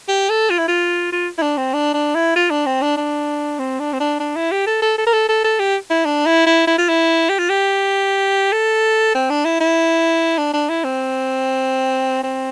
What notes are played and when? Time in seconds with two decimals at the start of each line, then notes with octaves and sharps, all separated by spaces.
0.09 G4
0.30 A4
0.50 F4
0.58 E4
0.68 F4
1.12 F4
1.38 E4
1.42 D4
1.57 C4
1.73 D4
1.94 D4
2.15 E4
2.36 F4
2.50 D4
2.66 C4
2.82 D4
2.97 D4
3.59 C4
3.80 D4
3.93 C4
4.00 D4
4.20 D4
4.36 E4
4.51 G4
4.66 A4
4.82 A4
4.98 A4
5.07 A#4
5.13 A4
5.29 A4
5.44 A4
5.59 G4
5.90 E4
6.05 D4
6.26 E4
6.46 E4
6.67 E4
6.78 F4
6.89 E4
7.29 G4
7.38 F4
7.49 G4
8.52 A4
9.15 C4
9.30 D4
9.45 E4
9.60 E4
10.38 D4
10.53 D4
10.69 E4
10.84 C4
12.23 C4